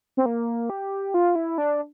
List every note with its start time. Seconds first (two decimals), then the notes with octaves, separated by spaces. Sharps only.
0.17 C4
0.26 A#3
0.70 G4
1.14 F4
1.35 E4
1.58 D4